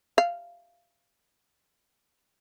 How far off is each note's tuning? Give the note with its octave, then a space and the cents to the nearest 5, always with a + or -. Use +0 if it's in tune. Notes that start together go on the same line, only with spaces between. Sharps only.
F5 -10